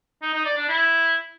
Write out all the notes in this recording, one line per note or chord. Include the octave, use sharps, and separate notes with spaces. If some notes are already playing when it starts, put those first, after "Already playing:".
D#4
D#4
D5
D4
E4